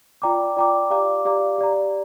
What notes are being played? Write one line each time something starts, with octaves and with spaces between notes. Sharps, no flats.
F4 D5 G5 A#5 D6
F4 D5 G5 A#5 D6
G4 D5 F5 A#5 D6
G4 D5 F5 A#5 D6
G4 D5 A#5